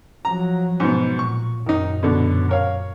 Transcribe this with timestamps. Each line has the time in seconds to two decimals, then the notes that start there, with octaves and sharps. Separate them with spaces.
0.25 F3 F#3 A#5
0.80 G#2 B2
1.19 A#2 C#6
1.66 F#2 A#2 D#3 D#4
2.03 B2 D3
2.49 A#4 C#5 F5